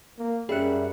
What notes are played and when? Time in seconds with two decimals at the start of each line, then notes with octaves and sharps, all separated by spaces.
0.18 A#3
0.49 F#2 G3 C#4 G#4 E5 F#6 C#7